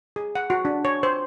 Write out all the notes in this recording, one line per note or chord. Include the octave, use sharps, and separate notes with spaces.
G#4
F#5
F#4
D4
C#5
C5